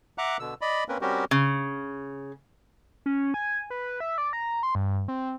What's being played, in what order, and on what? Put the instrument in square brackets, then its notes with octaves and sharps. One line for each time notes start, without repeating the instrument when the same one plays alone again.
[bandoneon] E5 F#5 A#5 D6 F#6
B2 D3 E6
D5 D#5 B5
A#3 C4 C#4 A#4 B4
G3 C4 C#4 F#4 G4 A#4
[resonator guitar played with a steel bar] C#3
[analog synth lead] C#4
G#5
B4
E5
D5
A#5
C6
G2
C4